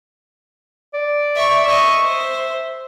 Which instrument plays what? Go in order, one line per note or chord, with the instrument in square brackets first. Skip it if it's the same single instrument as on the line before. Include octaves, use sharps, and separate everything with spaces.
[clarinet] D5
[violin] E5 C#6
[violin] D#5 C#6 [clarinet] E5
[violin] C5